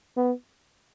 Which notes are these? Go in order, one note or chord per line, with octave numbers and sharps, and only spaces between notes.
B3